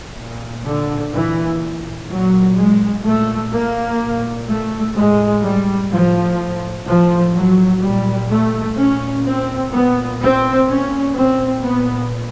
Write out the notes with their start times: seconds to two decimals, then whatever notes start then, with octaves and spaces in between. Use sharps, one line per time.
0.17 A#2
0.66 D3
1.13 A#2 E3
2.09 A#2 F#3
2.57 G#3
3.05 A#2 A3
3.53 A#3
4.00 A#2
4.47 A3
4.95 A2 G#3
5.43 G3
5.90 A2 F3
6.86 A2 F3
7.34 F#3
7.82 A#2 G3
8.29 A3
8.77 A#2 C#4
9.25 C4
9.72 A#2 B3
10.21 C4
10.67 A#2 C#4
11.16 C4
11.63 A#2 B3